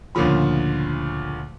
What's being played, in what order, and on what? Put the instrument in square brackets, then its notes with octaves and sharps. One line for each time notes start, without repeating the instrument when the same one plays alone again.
[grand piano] D2 A#2 C#3 F3 B5